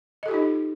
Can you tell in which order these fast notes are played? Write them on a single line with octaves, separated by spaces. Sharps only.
D#5 A4 G4 F4 D#4